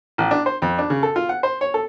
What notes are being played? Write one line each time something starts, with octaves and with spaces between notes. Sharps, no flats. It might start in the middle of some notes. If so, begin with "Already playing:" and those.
A1
D4
C5
F2
D4
C#3
A4
F4
F#5
C5
C#5
A4